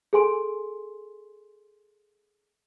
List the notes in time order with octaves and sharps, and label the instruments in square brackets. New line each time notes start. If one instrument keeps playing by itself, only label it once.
[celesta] G#4 A4 G#5 C6 D7